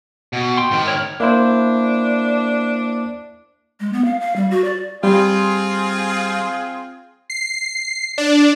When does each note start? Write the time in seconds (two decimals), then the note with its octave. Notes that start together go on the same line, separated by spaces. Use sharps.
0.33 B2
0.57 G5 C6
0.71 G#2 D#3
0.88 C#5 D5 F6
1.20 A#3 D4 E4 C5
3.80 G#3
3.93 B3
4.05 F5
4.20 F5
4.36 G3
4.51 F#4
4.65 D5
5.04 G3 C4 F4 G#4
7.30 C7
8.18 D4